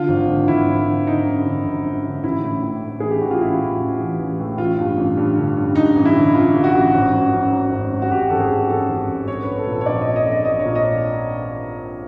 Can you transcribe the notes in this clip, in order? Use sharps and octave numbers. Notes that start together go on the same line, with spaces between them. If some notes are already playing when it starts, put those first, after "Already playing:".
Already playing: D3 F4
G#1
D3
G#1 E4
G#1
D3
D3 D#4
F#2
D3
G#1
F#2
D3
A1 E4
A2
A2
A2
E3 G#4
G4
A1 F#4
F4
A1 E4
A2
A1
E3
A1
A2
A1 F4
G2
A1
G2
D3
G2
G2 D#4
A1
E4
D3
A1 F4
D3
F#4
A1
G#1
F#2
F#2
F#2
G#1
F#2
F#4
G#1 G4
G#1 A4
G#4
F#2
F#2 A4
G#1
G#1
A#1 C#5
A#1 B4
A4
A#2
A4
C#5
A#1 D5
A#2 D#5
D#5
A#1
D#5
A#1 D#5
C#5
A#2
D#5